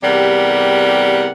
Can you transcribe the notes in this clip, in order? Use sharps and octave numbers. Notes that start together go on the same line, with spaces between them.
E2 C3 G3 G4 A#4 F#5